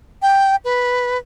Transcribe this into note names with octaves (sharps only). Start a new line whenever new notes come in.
G5
B4